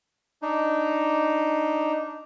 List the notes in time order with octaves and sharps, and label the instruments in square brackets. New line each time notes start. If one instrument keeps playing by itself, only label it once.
[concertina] D4 D#4